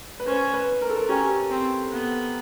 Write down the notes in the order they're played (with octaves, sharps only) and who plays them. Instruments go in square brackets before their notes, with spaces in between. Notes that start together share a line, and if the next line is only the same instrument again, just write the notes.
[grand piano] B4
[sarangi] C#4 [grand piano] C5
[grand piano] B4
A#4
A4
A#4
[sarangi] C#4 [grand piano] G4
[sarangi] C4
B3